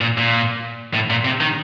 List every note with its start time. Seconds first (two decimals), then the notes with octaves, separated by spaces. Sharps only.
0.01 A#2
0.18 A#2
0.94 A2
1.10 A#2
1.25 C3
1.41 D#3